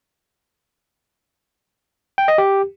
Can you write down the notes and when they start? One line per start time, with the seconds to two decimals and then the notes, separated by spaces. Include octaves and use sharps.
2.18 G5
2.28 D#5
2.38 G4